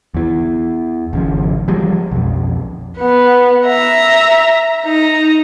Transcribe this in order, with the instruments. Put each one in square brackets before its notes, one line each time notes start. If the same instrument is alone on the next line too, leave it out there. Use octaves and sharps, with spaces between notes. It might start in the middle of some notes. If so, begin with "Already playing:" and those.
[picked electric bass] E2 E3
G#1 C#3 F3
E3 F3 G3 G#3
B1 F2
[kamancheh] B3 B4
E5 A#5
D#4 A#5